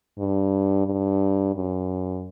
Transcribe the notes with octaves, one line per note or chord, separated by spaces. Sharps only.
G2
G2
F#2